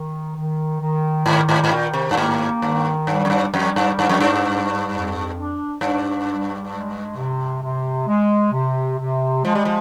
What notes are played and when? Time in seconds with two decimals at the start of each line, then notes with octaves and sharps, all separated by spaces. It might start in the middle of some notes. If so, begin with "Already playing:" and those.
Already playing: D#3
0.35 D#3
0.81 D#3
1.26 G#2 D#3
1.49 G#2
1.64 G#2
1.71 A#2 D#3
1.93 C3
2.11 G2
2.17 G#2 A#3
2.62 G2 D#3
3.07 G2 G3
3.25 F2
3.30 G2
3.53 F2 G3
3.76 G2
3.98 G2 D4
4.09 F2
4.20 G2
4.44 G3
4.90 F2
5.35 D4
5.80 G2 D4
6.26 G3
6.72 G#3
7.17 C3
7.62 C3
8.08 G#3
8.53 C3
8.99 C3
9.44 F3 G#3
9.55 G3
9.65 F3